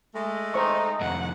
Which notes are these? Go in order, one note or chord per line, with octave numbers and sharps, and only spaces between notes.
G#3 A3
D#4 C5 C#6
C2 F2 F#5